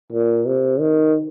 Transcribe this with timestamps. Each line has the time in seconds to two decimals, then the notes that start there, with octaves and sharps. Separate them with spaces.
0.12 A#2
0.47 C3
0.80 D#3